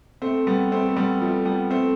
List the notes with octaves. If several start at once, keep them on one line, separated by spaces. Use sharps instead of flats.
A3 C4
G3 B3
A3 C4
A3
G3 B3
F3 A3
G3 B3
A3 C4